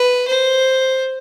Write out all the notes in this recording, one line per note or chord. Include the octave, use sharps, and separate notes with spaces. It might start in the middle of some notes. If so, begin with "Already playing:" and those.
Already playing: B4
C5